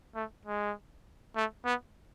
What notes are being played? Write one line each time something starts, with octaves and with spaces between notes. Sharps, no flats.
A3
G#3
A3
B3